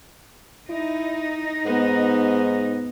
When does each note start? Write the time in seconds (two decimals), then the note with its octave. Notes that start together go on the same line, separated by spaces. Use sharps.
0.70 D#4 E4
1.66 G#2 B3